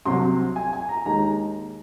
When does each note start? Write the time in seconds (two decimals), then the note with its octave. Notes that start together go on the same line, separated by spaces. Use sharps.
0.05 C2 C3 F#3 C6
0.56 G#5
0.73 G#5
0.89 A#5
1.06 D#2 D#3 G#3 A#5